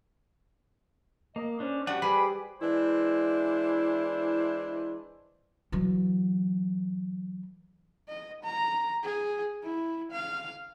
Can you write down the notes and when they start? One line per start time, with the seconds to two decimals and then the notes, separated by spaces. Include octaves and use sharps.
1.36 A#3 D#5
1.60 C#4 D4 C5
1.87 G3 D4 F#4 F#5
2.02 G3 G#4 B4 D5 B5
2.60 E3 G#3 D4 E4 C5
5.72 E3 F#3
8.08 D#5
8.43 A#5
9.03 G#4
9.63 E4
10.11 F5